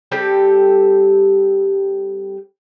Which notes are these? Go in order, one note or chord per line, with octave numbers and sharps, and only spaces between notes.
G3 C4 G4 A4